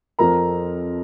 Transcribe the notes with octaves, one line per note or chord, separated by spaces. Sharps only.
F2 F3 C4 A#4 A#5